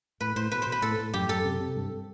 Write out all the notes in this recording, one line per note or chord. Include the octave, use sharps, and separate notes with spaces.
A2 B4
A2 C5
B2 B4
B2 C5
B4
A2 A4
A2
F#2 G4
F#2 A4
C3
C3
G2